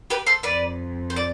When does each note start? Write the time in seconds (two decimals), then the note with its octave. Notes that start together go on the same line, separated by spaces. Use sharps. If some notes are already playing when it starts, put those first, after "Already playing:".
0.10 G4 B4
0.27 A4 C5
0.43 F2 B4 D5
1.10 C5
1.16 D5